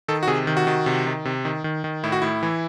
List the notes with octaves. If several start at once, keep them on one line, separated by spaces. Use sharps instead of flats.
D#3 A4
F#4
C3 G#4
D#3
F#4
D#3
C3
D#3
C3
D#3
D#3
D#3
A2 E4
F#4
A2 E4
E3